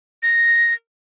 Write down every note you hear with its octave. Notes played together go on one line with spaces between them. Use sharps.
A#6